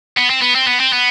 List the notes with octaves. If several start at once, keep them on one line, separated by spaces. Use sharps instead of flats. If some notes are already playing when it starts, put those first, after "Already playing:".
B3
C4
B3
C4
B3
C4
B3